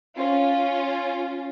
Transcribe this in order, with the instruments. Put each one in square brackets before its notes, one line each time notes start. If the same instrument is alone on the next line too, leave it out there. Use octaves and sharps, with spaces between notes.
[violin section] C#4 F4